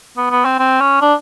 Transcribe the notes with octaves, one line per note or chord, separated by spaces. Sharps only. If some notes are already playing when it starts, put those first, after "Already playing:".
B3
B3
C4
C4
C#4
D4